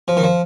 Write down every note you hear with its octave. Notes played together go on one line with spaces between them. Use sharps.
F3
D#3
F3